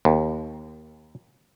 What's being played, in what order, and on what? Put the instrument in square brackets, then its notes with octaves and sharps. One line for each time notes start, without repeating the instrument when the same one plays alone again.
[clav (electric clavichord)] D#2